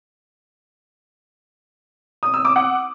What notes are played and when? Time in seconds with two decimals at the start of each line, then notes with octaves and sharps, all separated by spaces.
2.23 D#6
2.34 E6
2.45 D6
2.56 F#5